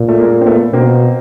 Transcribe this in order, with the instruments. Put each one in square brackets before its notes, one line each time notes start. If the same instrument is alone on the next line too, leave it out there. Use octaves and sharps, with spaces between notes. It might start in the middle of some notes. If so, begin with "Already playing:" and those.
Already playing: [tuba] A#2
[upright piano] A3
G#3 A#3
C4
A3 B3
[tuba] B2 [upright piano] A#3 C4